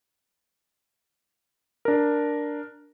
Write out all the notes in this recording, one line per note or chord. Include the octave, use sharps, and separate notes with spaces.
D4 A#4